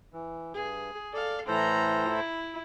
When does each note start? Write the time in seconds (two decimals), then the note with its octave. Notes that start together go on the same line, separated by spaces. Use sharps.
0.13 E3
0.54 G2 G#4
1.13 A4 D5 F5
1.48 A2 E3 A4 C5 A#5
2.09 E4